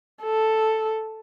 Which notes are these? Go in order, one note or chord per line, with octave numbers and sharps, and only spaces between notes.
A4